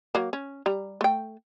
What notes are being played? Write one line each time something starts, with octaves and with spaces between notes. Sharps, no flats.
F#3 A#3
C#4
G3 A#5
A3 G5